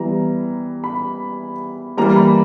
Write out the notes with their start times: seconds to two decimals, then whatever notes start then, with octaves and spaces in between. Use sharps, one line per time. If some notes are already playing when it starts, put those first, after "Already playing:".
Already playing: E3 G3 B3 A#5
0.84 B5
1.97 E3 G3 A#3 A#5
2.16 B5